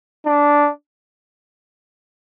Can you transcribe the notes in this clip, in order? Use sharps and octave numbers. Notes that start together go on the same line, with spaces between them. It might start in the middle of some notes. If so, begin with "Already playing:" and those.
D4